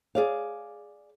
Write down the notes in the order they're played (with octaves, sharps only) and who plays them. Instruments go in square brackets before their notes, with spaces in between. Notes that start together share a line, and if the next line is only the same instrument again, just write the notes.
[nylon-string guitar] G#4 D5 F5